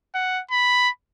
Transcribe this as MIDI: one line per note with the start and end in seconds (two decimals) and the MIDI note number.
0.15 0.41 78
0.51 0.89 83